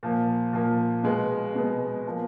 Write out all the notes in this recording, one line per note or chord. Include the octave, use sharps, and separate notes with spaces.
A#2 F3 A#3
A#2 F3 A#3
B2 G#3 B3
B2 G#3 B3
F3 A#3